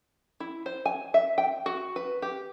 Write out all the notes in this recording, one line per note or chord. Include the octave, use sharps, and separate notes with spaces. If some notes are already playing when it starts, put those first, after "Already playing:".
E4
C5
G#5
E5
G5
F#4
B4
G4